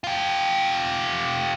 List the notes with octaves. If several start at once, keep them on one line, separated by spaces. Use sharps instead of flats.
F4 G4